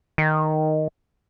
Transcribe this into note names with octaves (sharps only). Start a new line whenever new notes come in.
D#3